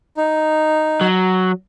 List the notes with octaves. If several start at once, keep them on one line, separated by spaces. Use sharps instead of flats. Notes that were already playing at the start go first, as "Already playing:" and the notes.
D#4
F#3